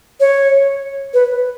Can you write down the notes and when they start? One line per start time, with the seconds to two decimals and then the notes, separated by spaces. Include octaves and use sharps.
0.20 C#5
1.14 B4